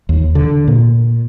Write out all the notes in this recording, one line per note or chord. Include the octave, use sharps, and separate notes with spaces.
D#2
D3
A#2